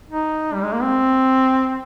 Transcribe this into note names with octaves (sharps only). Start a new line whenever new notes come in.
D#4
G3
G#3
A#3
C4